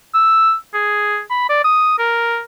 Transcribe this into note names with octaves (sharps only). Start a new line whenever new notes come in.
E6
G#4
B5
D5
D#6
A#4